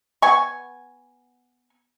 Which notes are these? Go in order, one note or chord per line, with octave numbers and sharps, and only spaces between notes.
B3 G#5 C#6